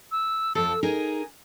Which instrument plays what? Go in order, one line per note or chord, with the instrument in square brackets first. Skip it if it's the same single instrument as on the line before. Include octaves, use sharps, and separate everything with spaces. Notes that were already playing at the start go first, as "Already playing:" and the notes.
[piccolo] E6
[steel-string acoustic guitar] F2 F3 A4 [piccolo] E6
[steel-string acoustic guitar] D#4 G#4 A#4 [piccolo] G#5